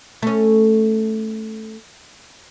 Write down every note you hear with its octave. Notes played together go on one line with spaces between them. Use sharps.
A3 C#4